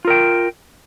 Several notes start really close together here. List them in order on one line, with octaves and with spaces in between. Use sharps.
F4 A#4 G5